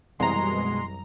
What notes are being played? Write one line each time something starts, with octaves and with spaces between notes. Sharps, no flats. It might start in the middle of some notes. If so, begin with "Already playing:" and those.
C2 F#2 B2 E3 G3 G#3 A#5 C6